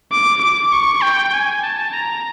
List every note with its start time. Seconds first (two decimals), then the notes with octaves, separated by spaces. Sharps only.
0.12 D6
0.42 D6
0.72 C#6
1.03 G5
1.33 G#5
1.63 A5
1.93 A#5